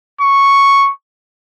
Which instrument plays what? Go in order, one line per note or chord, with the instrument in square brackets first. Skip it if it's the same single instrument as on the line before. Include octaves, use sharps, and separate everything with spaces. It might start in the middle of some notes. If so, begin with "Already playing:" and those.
[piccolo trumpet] C#6